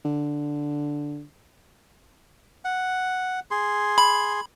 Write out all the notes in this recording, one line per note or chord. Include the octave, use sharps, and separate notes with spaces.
D3
F#5
G#4 C6
B5